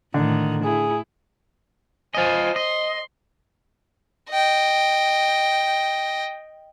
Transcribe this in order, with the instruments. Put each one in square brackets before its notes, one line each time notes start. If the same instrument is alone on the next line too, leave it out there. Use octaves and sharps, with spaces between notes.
[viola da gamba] A2 D#3 [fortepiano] D3
[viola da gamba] E4 [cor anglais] G#4
[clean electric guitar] F4 D#5 [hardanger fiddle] C5 G#5
[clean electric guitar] D#5 [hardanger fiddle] C6
[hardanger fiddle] D#5 G5